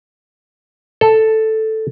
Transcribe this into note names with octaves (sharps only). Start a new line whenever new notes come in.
A4